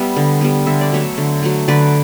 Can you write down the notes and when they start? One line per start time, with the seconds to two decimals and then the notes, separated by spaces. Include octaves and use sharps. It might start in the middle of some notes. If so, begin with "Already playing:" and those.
Already playing: G3 B3 E5
0.16 D3
0.41 G3 B3
0.66 D3 E5
0.81 D5
0.92 F#3 A3 C#5 E5
1.18 D3
1.43 F#3 A3
1.68 D3 B4 D5